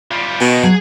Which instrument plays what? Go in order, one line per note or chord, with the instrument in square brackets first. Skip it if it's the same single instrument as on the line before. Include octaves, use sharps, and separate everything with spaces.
[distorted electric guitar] G3 F4
[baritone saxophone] B2 [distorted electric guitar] D#5 G5
[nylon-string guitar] F#3 [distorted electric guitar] G#4